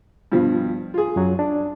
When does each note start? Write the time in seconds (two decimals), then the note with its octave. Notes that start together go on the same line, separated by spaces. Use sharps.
0.32 G2 B2 F3
0.94 F4 G#4
1.16 F#2 F#3
1.39 D4